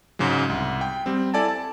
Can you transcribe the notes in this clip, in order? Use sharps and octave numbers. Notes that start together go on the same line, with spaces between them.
G#2 C#3 F#3 G#3
C2
G5
G3 C4
E4 A4 D5 G#5 A5
A5